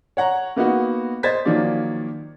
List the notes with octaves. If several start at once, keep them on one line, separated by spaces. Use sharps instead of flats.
C#5 F#5 A#5
A#3 B3 D#4 F#4
C5 D#5 G#6 A6 B6
D#3 F3 F#3 A#3 D5